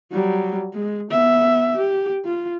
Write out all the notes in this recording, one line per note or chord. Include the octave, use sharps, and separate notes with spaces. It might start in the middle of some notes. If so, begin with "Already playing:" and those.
F#3 G3
G#3
B3 E5
G4
F4